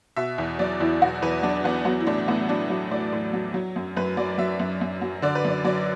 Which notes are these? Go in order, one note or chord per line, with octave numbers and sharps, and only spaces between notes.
B2 E5
E2
F#3 D5
E2 E4
B2 F#4
E2 B4
F#3 D4
E2 B3
F#3 B3
E4
A2 D4
A2 B3
F#3 D4
F#3
A2 D5
A2
F#3
F#3
F#2
F#2 B4
F#3 D5
F#3 E5
F#2
F#2
F#3
D3 D5
B4
F#2 D5
F#3 D5